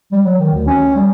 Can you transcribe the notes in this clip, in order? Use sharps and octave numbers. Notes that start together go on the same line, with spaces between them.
G3
F#3
D#3
D2
C#4
G3